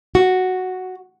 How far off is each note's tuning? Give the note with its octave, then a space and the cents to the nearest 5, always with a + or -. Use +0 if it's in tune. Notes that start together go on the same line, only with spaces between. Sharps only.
F#4 +0